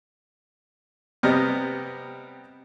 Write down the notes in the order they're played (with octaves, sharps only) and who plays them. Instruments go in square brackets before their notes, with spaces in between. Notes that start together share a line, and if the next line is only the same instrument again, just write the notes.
[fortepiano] C3 G3 B3 D#5 F6